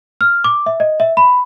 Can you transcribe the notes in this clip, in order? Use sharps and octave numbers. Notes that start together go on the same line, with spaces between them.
F6
D6
E5
D#5
E5
B5